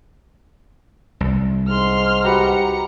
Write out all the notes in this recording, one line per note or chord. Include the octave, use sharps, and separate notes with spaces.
C2
G#2 C6 F6
F#4 G4 B4 A#5 C#7